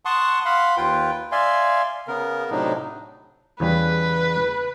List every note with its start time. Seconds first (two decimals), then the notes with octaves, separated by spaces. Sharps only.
0.05 F#5 A5 C6 C#6 D#6
0.45 F5 F#5 B5 C6
0.77 D#2 F4 B4 G5
1.32 D5 E5 F5 G#5 C6
2.08 C#3 B3 A#4
2.51 A2 C3 F#3 D4 D#4
3.60 E2 C#3 G3 B4